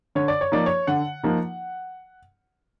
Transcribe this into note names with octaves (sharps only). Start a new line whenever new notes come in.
D3 C#5
D5
C#5
F3 A#3 D#4 D5
C#5
D3 F#5
F3 A#3 D#4